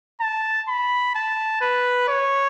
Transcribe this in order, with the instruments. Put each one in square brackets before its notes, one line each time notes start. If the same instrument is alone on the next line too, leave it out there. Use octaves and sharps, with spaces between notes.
[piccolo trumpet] A5
B5
A5
B4
C#5